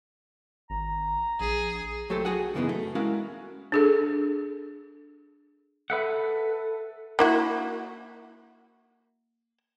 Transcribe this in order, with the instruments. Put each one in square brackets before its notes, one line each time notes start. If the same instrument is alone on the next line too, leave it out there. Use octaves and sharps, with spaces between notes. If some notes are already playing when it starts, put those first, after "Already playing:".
[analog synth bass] G#1 [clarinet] A#5
[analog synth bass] A#1 [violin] G#4
[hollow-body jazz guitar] F#3 A3 G4 A4 C5
F#4 G#4 F#5
F#2 C#3 E3 A3 B3 D#4
A3
G#3 C#4 E4 F#4 A#4 F5
[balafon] D4 G#4 A4
[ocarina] A4 [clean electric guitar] B4 E5 F#5
[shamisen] A#3 E4 F#4